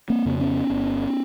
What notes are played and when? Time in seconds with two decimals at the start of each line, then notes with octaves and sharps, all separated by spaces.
0.10 A#3 C4
0.25 F2 C#3
0.39 B3 C#4
0.70 G1